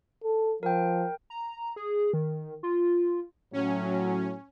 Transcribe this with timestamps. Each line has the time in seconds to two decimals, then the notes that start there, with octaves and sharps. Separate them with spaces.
0.24 A4
0.63 F3 A#4 G5
1.30 A#5
1.76 G#4
2.13 D#3
2.63 F4
3.53 A2 F#3 C#4